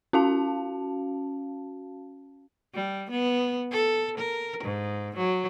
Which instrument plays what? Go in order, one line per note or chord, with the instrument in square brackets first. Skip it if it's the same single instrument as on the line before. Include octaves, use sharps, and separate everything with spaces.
[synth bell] C#4 F#4 F5 A5
[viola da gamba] G3
B3
A4
A#4
G#2
F#3